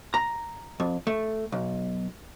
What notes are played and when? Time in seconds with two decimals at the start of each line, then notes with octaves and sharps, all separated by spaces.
0.14 A#5
0.80 F2
1.07 A3
1.52 B1